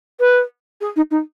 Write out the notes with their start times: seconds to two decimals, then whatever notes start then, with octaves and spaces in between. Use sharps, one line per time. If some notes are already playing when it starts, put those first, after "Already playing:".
0.20 B4
0.81 G#4
0.96 D#4
1.11 D#4